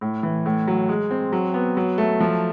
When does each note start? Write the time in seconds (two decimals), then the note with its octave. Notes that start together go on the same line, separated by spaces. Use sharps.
0.01 A2
0.23 E3
0.46 A2
0.67 F#3
0.89 G#3
1.11 C4
1.32 F#3
1.54 B3
1.77 F#3
1.98 A3
2.20 F3